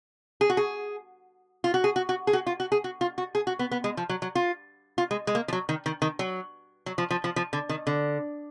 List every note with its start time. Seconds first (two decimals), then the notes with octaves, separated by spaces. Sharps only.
0.41 G#4
0.50 F#4
0.57 G#4
1.64 F4
1.74 F#4
1.84 G#4
1.96 F#4
2.09 F#4
2.27 G#4
2.33 F#4
2.47 F4
2.60 F#4
2.72 G#4
2.84 F#4
3.01 F4
3.18 F#4
3.35 G#4
3.47 F#4
3.59 B3
3.71 B3
3.84 G#3
3.97 F3
4.09 F#3
4.22 F#3
4.35 F4
4.98 F4
5.11 G#3
5.27 G#3
5.35 A#3
5.48 F3
5.53 F#3
5.69 D#3
5.86 D#3
6.02 D#3
6.19 F#3
6.86 F#3
6.98 F3
7.11 F3
7.24 F3
7.36 F3
7.53 D3
7.69 D#3
7.87 D3